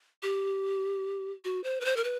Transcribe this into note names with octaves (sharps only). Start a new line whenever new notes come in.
G4
F#4
C5
B4
C5
A#4
B4